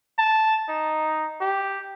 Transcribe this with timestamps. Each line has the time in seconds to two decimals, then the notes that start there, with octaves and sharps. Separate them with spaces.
0.19 A5
0.69 D#4
1.41 G4